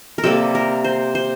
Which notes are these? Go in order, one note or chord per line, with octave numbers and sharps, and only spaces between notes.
A#4
C3 G3 A#3 A4
A#4
C5
C5